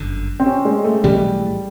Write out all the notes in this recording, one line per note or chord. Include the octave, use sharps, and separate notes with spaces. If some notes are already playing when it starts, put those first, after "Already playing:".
Already playing: G1 F#2 D3
C4
C#4
G#3
A3
B1 A2 E3 G3 A3